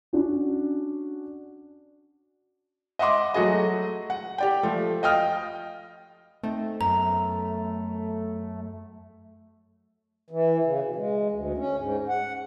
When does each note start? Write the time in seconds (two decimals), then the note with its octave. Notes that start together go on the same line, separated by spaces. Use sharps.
0.13 C#4 D4 F#4
2.99 D#5 E5 F#5 C6 D6
3.34 F#3 A3 F#4 G#4 D#5
4.10 F#5
4.38 G4 D5 G5
4.63 F3 A3
5.03 D#5 F5 G5 D#6 F6
6.43 A3 C4 D#4
6.81 F#2 B3 A#5
10.30 E3
10.64 C#3
10.82 B2
10.96 G#3
11.31 D2
11.58 C#4
11.77 G#2
12.09 F#5